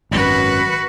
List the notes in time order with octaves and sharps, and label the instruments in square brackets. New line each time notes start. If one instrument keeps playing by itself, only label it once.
[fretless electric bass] G#1 F#2 [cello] F#4 B4